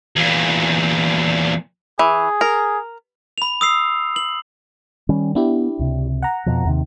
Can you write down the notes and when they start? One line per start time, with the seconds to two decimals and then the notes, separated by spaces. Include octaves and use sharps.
0.16 E2 A#2
1.99 E3 G#4
2.41 A#4
3.38 B5 F7
3.61 D#6 E6 C7
4.16 F#7
5.09 D#3 G3 C#4
5.35 B3 D4 E4 G4
5.79 C#2 C3
6.23 F#5 A#5
6.46 F2 B2 F3
6.65 D#2 C3 D#3